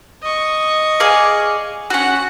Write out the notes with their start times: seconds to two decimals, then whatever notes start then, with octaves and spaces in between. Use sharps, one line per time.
0.23 D#5 C#6
1.00 G#4 D5 F5
1.90 C#4 F#4 F#5